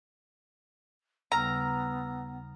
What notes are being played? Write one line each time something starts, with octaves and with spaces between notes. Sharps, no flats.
D#2 C#3 G3 B3 A#5 E6 F6